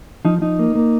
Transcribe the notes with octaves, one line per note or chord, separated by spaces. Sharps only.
F3 D#4
F3 D#4
A#3
A#3